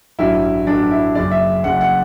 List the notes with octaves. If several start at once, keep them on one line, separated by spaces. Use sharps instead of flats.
A1 G2 F#3 E4
A1 G2 F#3 D4
E4
F#1 F#2 C#3 D5
E5
F#1 F#2 C#3 F#5
F#5